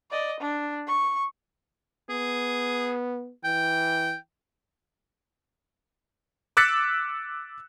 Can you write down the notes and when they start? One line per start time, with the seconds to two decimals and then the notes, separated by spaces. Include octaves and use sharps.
0.11 D5 D#5
0.40 D4
0.87 C#6
2.09 B3 G#4
3.44 E3 G5
6.57 D6 E6 F#6 A6 B6 C#7